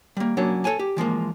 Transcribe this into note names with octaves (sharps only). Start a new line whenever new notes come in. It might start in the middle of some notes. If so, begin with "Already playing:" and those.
G3 A#3
F#3 A#3 C#4 D4 C#5
A4 A#4 C#5 G#5 A5
G4
E3 F3 G#3 A#3